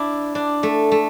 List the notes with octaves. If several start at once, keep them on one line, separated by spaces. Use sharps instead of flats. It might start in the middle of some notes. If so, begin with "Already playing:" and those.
Already playing: D4 E4
D4
A3
A3